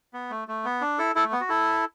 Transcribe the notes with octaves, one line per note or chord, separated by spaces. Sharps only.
B3
A3
A3
B3
D4
E4 A4
E4 A4
A3
B3
F#4
E4 A4